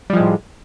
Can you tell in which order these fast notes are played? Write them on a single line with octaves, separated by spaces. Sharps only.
G3 F3 G#3 A2